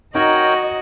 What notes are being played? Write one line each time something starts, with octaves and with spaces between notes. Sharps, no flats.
D#4 F#4 A#4 C#5 D#5 G5